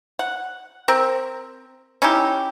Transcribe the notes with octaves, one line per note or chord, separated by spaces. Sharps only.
F#5
C4 A#4
C#4 D#4 E4 G4